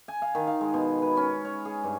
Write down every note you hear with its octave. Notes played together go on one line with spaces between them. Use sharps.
G#5
F5
D#3
F5
G#3
B2
B4
C#4
C#5
G#4
G2